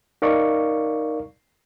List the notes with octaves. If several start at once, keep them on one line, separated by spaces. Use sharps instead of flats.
D#4 A#4 D5 F5 C#6